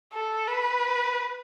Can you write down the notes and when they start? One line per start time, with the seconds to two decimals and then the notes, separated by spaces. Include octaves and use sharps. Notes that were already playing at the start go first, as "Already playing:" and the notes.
0.13 A4
0.48 B4